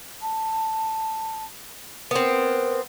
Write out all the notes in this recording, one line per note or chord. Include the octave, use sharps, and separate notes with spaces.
A5
B3 C4 A#4